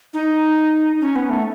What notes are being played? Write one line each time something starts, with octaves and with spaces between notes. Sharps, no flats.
D#4
C#4
B3
A3